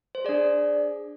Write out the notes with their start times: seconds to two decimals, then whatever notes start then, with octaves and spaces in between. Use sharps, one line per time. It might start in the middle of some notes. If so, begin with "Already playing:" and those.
0.15 C5
0.25 D4 G#4 D5